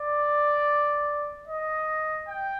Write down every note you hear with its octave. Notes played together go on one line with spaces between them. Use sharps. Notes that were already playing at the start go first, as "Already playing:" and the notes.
Already playing: D5
D#5
G5